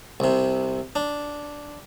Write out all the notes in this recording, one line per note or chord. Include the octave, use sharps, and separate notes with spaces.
C2 C3
D4